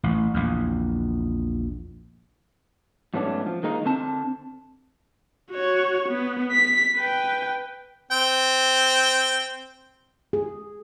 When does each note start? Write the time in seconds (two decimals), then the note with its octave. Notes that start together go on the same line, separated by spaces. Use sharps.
0.03 A1
0.34 A#1 E2
3.14 G#2 F#3 A3 B3 C#4 D4
3.46 F3
3.63 D#3 G#3 A#3 D#4
3.85 D3 C4 A5
5.52 F#4 C#5
6.09 B3
6.52 B6
6.96 B4 G5
8.11 C4 G5
10.33 G#4